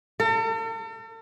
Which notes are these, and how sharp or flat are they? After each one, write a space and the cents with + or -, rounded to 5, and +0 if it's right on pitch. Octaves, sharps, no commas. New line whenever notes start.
A4 +45